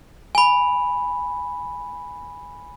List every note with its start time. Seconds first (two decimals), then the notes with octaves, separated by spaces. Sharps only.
0.35 G#5 B5